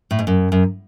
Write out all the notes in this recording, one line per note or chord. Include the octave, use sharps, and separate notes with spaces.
A2
G#2
F#2
F#2